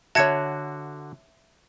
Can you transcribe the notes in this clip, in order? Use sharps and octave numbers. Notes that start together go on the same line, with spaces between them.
D3 F#4 C#5 E5 A5 G#6 C#7